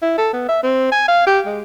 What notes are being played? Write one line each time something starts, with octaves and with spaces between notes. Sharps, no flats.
E4
A4
B3
E5
C4
G#5
F5
G4
G#3